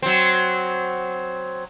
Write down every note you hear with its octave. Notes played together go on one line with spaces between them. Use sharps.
F#3 C4